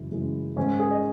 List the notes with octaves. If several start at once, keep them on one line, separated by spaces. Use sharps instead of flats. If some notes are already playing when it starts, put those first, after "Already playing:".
Already playing: F#2 C#3 E3 G#3 E4
F#2 C#3 E3 G#3
G#2 D#3 G#3 C#4
G#4
D#5